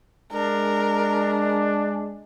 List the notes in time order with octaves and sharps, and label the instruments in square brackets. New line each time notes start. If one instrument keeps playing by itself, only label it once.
[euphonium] G#3 [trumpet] D4 [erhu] A#4